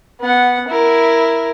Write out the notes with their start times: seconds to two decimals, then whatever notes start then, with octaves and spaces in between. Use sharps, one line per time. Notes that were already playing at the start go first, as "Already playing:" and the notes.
0.21 B3 F#5
0.68 E4 A#4